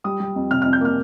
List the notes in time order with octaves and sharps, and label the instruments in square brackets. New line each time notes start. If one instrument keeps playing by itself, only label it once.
[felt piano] G3 D#6
G3
F2
C3 F6
F6
F2
G6
A#3 F6